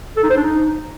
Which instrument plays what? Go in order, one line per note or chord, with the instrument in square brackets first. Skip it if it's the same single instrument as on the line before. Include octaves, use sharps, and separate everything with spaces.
[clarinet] A4
D#4
C5
D4
D#4